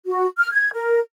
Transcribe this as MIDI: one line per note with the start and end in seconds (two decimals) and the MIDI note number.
0.07 0.26 66
0.38 0.50 89
0.53 0.70 92
0.73 1.00 70